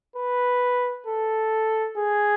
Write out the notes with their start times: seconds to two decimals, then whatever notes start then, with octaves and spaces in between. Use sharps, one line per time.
0.16 B4
1.06 A4
1.98 G#4